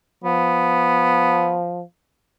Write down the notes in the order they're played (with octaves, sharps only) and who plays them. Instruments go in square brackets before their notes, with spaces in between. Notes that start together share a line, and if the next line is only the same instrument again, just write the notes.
[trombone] F3 [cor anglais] B3